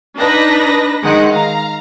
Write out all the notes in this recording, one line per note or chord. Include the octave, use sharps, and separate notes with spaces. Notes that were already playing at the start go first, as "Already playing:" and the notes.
D4 D#4 B4 A#6
D#3 G#3 D#4 F#5
F5 A#5